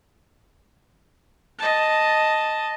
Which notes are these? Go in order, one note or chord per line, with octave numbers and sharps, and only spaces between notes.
D#5 A5